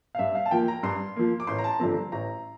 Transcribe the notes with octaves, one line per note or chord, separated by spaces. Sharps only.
F5
G2 E5
F5
A5
F3 A#3 G5
A#5
G2 C6
F3 A#3
D6
A1 C6
A#5
A5
G2 D3 F3 C4 A#5
A1 A#5